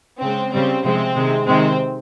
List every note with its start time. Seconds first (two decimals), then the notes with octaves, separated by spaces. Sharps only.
0.21 C#3 G#3 C4
0.52 C#3 G3 C4
0.84 C3 F3 G#3 C4
1.15 C3 D#3 G#3
1.47 C3 D#3 G#3 C4